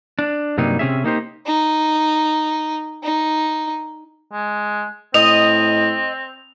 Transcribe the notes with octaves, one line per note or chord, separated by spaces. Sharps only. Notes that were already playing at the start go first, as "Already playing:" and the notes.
D4
G2 C3 F#3 G3 A#3 D#4
C3 C4 C#4 G#4 E5
A#3 D#4 G4 C5
D#4
D#4
G#3
A2 C4 D#5 F7